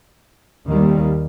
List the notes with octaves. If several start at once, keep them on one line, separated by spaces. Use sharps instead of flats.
D#2 D#3 G3 A#3